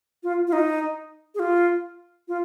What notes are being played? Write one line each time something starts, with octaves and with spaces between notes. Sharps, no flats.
F4
F4
D#4
G#4
F4
F4